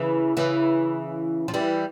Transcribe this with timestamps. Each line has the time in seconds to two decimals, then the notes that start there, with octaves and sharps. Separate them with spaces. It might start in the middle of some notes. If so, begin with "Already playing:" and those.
Already playing: C#3 E3
0.37 C#3 E3
1.48 F3
1.54 E3 G3